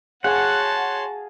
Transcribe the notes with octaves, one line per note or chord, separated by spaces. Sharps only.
F#4 G#4 C#5 F5 F#5 A5 C6